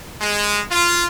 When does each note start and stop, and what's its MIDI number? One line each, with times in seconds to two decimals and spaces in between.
0.21 0.62 56
0.70 1.06 65